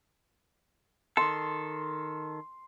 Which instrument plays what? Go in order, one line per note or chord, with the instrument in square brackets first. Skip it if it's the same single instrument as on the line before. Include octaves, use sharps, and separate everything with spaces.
[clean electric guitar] D#3 A4 [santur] C6